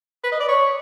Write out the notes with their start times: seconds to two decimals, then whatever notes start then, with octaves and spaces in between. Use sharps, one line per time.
0.24 B4
0.32 D#5
0.40 D5
0.48 C#5